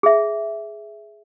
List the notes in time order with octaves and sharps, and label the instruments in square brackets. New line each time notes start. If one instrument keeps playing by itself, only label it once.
[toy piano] G#4 E5